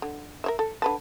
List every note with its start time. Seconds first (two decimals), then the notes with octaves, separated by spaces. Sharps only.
0.02 D3
0.44 A#4 C#5 E5
0.59 A4
0.82 D3 B4 A5